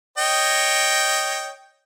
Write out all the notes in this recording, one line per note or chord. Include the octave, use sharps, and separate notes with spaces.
C#5 D#5 G5